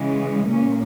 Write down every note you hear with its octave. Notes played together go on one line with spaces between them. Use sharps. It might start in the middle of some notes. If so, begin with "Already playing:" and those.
Already playing: C#3 E3 G#3
A#2 A#3 C#4